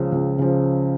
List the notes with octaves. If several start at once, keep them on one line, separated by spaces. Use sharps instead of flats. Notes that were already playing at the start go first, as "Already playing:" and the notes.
Already playing: C#2 C#3 F3
C#2
C#3 F3